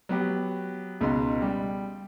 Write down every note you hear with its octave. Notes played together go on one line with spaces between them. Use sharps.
F#3 B3 G4
C#2 B2 D#4 C6
G3